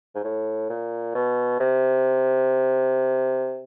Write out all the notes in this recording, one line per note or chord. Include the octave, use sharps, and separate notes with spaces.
G#2
A2
A#2
B2
C3